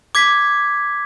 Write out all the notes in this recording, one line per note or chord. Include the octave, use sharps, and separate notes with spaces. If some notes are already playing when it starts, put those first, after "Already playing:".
D6 G#6 B6